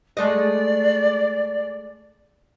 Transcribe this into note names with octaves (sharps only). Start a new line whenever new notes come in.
G#3 A3 D5 D#5